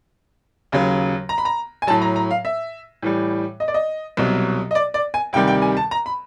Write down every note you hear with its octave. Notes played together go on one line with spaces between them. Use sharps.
D#2 C#3 F#3
A#5
B5
A#5
G#5
A2 F#3 A5
A#5
A#5
F5
E5
A2 E3 G3
D#5
D5
D#5
C2 B2 F#3
D#5
D5
D5
G#5
D2 C3 D#3 G3 G5
G5
G#5
A5
A#5
B5